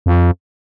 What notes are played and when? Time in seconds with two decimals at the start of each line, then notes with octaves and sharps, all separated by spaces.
0.06 F2